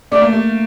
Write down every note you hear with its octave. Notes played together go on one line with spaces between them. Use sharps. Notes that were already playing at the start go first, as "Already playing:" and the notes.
A3 D5
A#3
A3